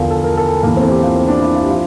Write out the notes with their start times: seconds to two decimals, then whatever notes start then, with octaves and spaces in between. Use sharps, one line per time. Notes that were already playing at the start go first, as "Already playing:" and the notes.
Already playing: E2 D3 F3 F4 A4 A#4
0.10 A4
0.24 A#4
0.37 A4
0.50 A4
0.63 E2 E3 A#3
0.77 C4
0.83 A4
0.89 G4
1.03 F4
1.15 C4
1.28 D4
1.42 E4
1.55 F4
1.63 G4
1.69 F3 F4